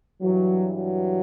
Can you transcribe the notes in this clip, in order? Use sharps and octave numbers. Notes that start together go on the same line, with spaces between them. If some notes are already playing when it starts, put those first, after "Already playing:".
G2 E3 F#3
F#3